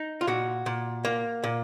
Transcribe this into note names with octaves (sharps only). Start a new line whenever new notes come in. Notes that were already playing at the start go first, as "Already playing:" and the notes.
Already playing: D#4
F4
A#2 F#4
A#2
A#3
A#2